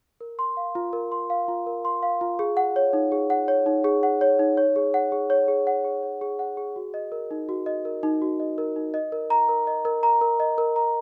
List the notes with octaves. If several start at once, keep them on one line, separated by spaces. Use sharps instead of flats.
A#4
C6
F5
F4
A#4
C6
F5
F4
A#4
C6
F5
F4
G#4
F#5
C#5
D#4
G#4
F#5
C#5
D#4
G#4
F#5
C#5
D#4
C#5
G#4
F#5
G#4
C#5
G#4
F#5
G#4
C#5
G#4
F#5
G#4
F#4
D#5
A#4
D#4
F#4
D#5
A#4
D#4
F#4
D#5
A#4
D#4
D#5
A#4
A#5
A#4
D#5
A#4
A#5
A#4
D#5
A#4
A#5